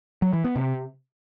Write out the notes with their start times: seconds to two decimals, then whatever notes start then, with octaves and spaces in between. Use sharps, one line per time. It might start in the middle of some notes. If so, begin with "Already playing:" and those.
0.22 F#3
0.33 E3
0.44 B3
0.56 C3